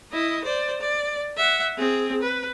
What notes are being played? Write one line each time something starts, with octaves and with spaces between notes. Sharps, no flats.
E4 D#5
C5 D5
D5
E5 F#5
C4 G#4
B4